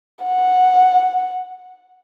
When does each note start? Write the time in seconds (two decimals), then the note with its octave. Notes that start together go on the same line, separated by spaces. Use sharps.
0.24 F#5